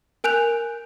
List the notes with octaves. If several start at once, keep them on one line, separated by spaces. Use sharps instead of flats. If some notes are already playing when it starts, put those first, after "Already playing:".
A#4 G#5 F#6 G6 F7